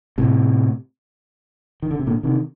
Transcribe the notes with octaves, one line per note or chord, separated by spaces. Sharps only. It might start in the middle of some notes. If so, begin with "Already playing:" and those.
A2 C3
D#3
D3
C3
A#2 D3
C3 D#3